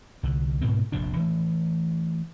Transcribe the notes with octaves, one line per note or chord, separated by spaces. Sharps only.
C2 D3
G#2 B2 C4
F1 A#1 C3 D4
E3 A3